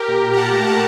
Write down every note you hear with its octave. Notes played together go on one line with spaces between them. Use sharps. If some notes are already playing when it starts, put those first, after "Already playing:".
Already playing: G4 A#4
A#2
A#2
A#5
A#2 F#5 A5
A3
A3 F#5 A5